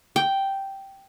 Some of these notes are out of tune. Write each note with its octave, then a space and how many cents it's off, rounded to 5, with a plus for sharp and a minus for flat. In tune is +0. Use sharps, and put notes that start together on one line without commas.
G5 -5